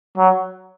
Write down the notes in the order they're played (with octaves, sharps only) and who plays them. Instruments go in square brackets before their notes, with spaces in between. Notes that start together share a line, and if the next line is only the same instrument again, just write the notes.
[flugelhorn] F#3